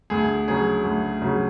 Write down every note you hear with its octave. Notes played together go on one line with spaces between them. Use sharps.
D2 G#4
C#3 F#3 G#4
D2
C#3 F#3